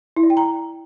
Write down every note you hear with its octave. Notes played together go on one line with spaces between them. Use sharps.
E4
D5
G5
A#5